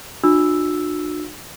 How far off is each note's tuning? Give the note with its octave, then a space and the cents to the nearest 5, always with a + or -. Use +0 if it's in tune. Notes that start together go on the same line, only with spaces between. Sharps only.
D4 +45 F#4 -40 E6 +0